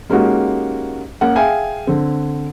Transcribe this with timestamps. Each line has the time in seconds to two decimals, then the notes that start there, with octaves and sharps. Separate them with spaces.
0.10 G#3 A#3 C#4 D#4 F#4 G4
1.21 A#3 C#4 F#5
1.35 G#4 E5 F5 G5 G#5
1.87 D3 C4